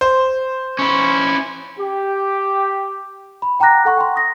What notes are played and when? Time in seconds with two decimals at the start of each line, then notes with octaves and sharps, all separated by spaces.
0.01 C5
0.79 C#4 E4
1.79 G4
3.42 B5
3.59 F#5 G5 A#5 D6 F#6 A#6
3.85 A4 F#5 C#6
3.97 G5 C6
4.16 D#6 A#6